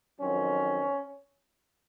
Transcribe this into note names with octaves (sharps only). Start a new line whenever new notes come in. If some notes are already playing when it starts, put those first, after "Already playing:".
F2 D#3 F#3 C4 C#4